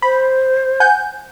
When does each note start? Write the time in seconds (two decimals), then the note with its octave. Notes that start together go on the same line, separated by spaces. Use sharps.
0.02 C5 B5
0.80 F#5 G#5 G6